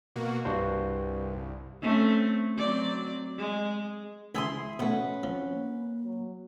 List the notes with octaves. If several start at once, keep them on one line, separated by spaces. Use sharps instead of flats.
B2 A#3 F#4
C2 G2 F#4 C5
A3 C4 C#4
F#3 C4 D5
G#3
C#2 E4 G#4 E5 A5 C6
B2 A3 C#4 B4 F#5
F3 C4
A#3
F#3